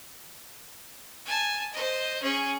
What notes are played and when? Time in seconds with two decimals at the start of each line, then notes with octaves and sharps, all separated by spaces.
1.26 G#5 A5
1.73 C5 D#5
2.23 C#4 G#4